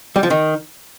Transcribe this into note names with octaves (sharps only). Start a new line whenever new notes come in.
G3
F3
D#3